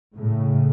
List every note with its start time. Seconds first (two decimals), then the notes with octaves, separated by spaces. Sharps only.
0.15 A2 C#3